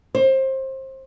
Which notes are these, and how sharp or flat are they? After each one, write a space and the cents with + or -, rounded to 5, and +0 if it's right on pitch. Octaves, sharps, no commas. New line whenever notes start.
C5 +25